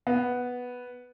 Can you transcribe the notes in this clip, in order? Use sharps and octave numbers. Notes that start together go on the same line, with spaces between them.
B3